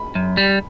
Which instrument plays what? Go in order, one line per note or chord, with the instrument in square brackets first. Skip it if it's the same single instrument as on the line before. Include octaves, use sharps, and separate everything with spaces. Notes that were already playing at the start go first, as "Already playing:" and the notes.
Already playing: [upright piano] B5
[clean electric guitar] F#2
G3